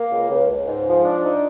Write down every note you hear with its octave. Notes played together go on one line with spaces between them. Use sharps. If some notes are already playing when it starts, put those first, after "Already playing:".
Already playing: A#3
C#2
C#2
C#2
G#2
F3
D4
D#4